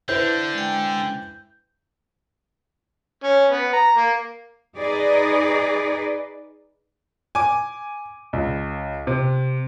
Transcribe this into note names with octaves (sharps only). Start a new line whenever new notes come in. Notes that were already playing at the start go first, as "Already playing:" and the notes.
D3 E4 B4 C5 G6
G#3 G5
C#4
B3
A#5
A#3
D#4 G#4 B4 D5 D#5
G#5 D6
C#2
C3